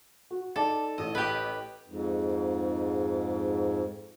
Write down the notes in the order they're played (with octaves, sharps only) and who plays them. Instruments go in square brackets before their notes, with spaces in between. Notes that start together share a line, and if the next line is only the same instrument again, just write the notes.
[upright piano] F#4
[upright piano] D#4 D5 A5 [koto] A4
[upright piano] A1 E6 [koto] D#5
[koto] G4 B4
[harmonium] F2 G#2